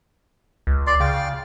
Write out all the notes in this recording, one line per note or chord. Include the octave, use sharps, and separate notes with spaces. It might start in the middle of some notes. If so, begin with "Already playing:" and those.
C#2
D5 C6
C#3 F5 G5